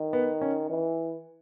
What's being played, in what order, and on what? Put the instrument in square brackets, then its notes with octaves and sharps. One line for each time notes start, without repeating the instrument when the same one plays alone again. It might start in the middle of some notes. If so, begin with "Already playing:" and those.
Already playing: [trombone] D#3
[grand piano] B3
C#4
[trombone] E3